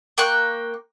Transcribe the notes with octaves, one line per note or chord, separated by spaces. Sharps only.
A#3 G5 C#6 F#6